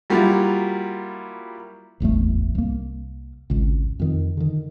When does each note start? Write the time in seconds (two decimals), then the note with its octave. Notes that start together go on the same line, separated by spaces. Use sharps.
0.10 F#3 G3 A#3 E4 F4 A#4
2.00 D1 G#1 E2 A3
2.55 C2 A#3
3.50 G#1 C#2
4.00 F2 D#3
4.37 D3 D#3